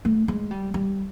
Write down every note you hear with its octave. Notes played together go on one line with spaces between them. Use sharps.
A3
G#3
G3
G3